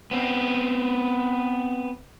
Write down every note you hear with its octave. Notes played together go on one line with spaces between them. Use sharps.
B3 C4